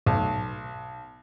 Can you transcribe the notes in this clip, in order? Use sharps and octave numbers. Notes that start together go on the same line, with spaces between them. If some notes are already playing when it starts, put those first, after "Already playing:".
B1